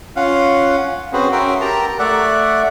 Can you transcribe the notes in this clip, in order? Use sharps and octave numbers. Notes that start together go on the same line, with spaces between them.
C#4 F4 F5 F#5
C4 C#4 F#4 G#4 B4 C5
C#4 F#4 A#4 E5 G5 C6
G4 A#4 A5 A#5
A3 D5 E5 F#5